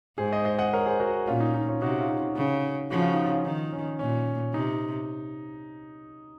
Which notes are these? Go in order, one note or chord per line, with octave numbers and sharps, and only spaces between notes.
G#2 G#4 C5
C5 D#5
C5 D#5
D#5 F#5
A#4 C#5
G#4 C5
F#4 A#4
A#2 C#4 F4
D#4
D#4
C#4 F4
C3 D#4 F#4
F4
D#4 F#4
C#3
C#3 F3 F#4
F4
D#4
C#4 F4
D#3 D#4
C#4
A#2 C#4
C3 D#4